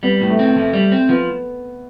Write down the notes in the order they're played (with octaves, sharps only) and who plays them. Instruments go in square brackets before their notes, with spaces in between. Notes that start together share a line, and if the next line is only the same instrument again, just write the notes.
[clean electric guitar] G3 [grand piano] B3
[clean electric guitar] A2
[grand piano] A3
[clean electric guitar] C4
[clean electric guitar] F2 [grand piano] A3
[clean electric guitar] G3
C4
[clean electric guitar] F3 [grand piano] B3